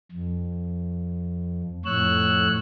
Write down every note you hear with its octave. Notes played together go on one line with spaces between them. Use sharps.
F2
F2 A2 C#5 E6 F#6